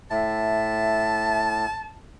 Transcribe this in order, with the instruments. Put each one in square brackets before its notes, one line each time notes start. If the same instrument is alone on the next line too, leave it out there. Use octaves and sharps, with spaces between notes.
[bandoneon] A2 [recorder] E5 [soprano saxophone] A5